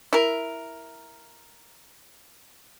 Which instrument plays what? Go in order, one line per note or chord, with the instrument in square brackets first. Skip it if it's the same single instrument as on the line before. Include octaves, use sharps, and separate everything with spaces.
[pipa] E4 A#4